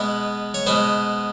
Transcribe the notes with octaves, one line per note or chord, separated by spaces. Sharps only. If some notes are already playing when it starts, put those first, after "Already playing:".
Already playing: B2 G#3 B3 B4
C#5
B2 G#3 B3 C5